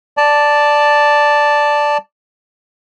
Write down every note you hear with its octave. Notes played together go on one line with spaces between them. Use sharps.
D5 A5